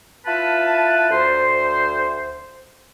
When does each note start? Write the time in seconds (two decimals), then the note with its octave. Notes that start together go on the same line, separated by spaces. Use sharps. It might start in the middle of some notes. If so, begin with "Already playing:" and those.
0.24 E4 F4 B4 A5
1.10 D2 C5